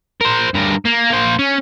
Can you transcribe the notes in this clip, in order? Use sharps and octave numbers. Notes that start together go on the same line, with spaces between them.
A#4 C5
G2 A#4
A#3
A#3 C5
C#4